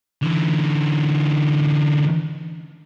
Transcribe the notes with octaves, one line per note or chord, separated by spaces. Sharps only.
D3 E3